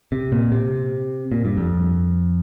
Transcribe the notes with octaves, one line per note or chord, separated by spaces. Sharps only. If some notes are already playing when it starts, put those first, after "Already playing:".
C3
A#2
C3
A#2
G2
F2